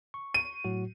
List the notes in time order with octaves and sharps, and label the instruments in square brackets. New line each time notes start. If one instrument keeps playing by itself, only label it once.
[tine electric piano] C#6
[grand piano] D#7
[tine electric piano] A2 F#3 F#4